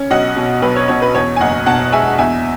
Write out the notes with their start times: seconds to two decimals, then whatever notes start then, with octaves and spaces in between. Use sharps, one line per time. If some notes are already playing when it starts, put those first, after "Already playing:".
Already playing: C#4
0.11 B1 D#5 F#5
0.36 B2
0.62 B1 B4
0.76 C#5
0.88 B2 C#5
1.02 B4
1.15 E2 C#5
1.36 G#5
1.40 F#1 D#5 F#5
1.66 B2 F#5 A5
1.92 G#3 E5 G#5
2.18 E2 E5 G#5